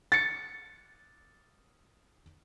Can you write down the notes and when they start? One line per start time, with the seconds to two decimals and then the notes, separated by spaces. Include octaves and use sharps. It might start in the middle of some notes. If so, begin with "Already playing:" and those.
0.12 A6 C#7